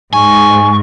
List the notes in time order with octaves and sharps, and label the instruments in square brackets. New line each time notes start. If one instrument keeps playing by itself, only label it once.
[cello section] G#2 [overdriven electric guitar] G#5 [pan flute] C#6